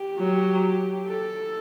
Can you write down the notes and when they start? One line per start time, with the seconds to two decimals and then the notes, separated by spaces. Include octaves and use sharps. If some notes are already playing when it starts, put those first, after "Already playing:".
Already playing: G4
0.19 F#3
1.08 A4